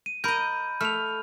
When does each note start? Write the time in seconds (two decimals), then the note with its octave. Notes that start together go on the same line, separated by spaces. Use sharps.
0.06 D#7
0.24 A#4 D#5 B5 G6
0.81 A3 F6 F7